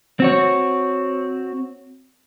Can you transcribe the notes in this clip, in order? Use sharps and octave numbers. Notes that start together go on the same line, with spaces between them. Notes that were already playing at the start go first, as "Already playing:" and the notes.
C4 F#4 C#5